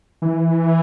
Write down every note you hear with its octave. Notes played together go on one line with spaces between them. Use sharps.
E3